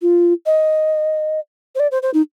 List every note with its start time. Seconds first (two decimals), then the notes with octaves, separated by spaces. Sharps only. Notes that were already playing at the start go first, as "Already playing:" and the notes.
0.02 F4
0.46 D#5
1.75 C5
1.80 D5
1.92 C5
2.03 C5
2.14 D#4